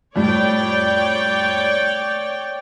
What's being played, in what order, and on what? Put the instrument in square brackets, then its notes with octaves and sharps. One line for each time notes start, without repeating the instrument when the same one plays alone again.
[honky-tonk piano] F2 A2 G3 [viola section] C#5 D5 G5